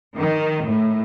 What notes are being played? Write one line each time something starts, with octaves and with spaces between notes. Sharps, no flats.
D#3
A2